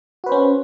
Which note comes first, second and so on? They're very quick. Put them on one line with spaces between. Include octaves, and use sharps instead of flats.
F#4 B4 C5 C#4